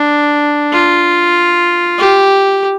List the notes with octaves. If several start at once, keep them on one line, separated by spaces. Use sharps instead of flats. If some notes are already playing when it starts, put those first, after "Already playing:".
Already playing: D4
F4
G4